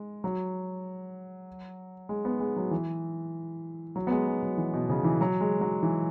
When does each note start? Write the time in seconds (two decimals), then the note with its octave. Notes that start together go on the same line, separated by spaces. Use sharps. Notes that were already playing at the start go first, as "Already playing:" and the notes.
Already playing: G#3
0.24 F#3
2.09 G#3
2.25 B3
2.40 G#3
2.57 F#3
2.71 E3
3.96 F#3
4.07 B3
4.11 G#3
4.27 G#3
4.43 F#3
4.58 E3
4.73 B2
4.89 C#3
5.04 E3
5.21 F#3
5.41 G#3
5.61 F#3
5.83 E3